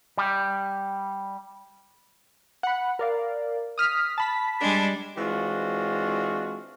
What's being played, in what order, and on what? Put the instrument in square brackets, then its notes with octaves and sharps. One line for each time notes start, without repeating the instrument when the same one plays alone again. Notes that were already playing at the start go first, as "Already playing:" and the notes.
[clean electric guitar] G3
[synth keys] F#5 B5
A#4 D5 F5
D#6 F6 B6
A5 B5 B6
[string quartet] G3 G#3 D4
[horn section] E3 G#3 C4 D4 F4 F#4